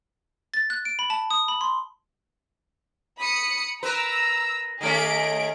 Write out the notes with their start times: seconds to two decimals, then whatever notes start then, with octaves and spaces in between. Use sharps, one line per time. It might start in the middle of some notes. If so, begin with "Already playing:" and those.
0.54 A6
0.70 F#6
0.85 D7
0.99 B5
1.10 A5
1.30 D#6
1.48 B5
1.61 C6
3.19 B5 D#6 C#7
3.83 A#4 B4 A#5 E6
4.81 D#3 A3 C#4 G#4 D7